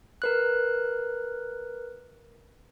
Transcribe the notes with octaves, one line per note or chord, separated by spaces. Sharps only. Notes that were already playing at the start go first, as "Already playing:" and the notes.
A#4 B4 F#6